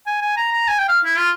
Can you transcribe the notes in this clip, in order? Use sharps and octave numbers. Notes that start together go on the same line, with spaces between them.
G#5
G#5
A#5
A#5
G#5
G5
F5
E4
F4